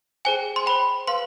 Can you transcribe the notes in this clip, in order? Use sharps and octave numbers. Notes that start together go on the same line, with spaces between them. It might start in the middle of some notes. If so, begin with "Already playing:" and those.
G#4 C5 G5 G#5
C6
C5 G5 B5
B4 F5 C6